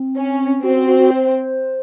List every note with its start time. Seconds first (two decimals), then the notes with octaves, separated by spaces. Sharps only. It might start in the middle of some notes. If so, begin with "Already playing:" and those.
Already playing: C4
0.16 C#4
0.63 C4 F#4
0.76 F#4
0.87 F#4
0.98 F#4
1.11 C5